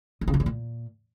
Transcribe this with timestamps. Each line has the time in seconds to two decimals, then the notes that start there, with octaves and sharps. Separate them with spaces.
0.21 D#3
0.28 C#3
0.34 F#2
0.40 E2
0.46 A#2